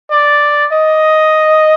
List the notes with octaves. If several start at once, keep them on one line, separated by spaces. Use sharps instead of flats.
D5
D#5